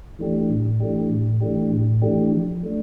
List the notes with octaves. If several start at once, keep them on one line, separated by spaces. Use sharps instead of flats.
E3 A3 D4 G4
A2
E3 A3 D4 G4
A2
E3 A3 D4 G4
A2
E3 A3 D4 G4
F3
A3 D4